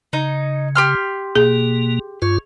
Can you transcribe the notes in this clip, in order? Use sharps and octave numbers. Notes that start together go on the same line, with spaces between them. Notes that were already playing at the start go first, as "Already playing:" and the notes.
C#3 D#4
G4 C6 F6
B2 A#3 G#4
G2 F4 C#5